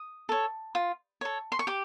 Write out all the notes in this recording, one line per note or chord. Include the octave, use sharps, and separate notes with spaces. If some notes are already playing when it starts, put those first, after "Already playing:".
Already playing: D#6
A4 C#5
F4
A4 C#5
C6
C#6
G4 D6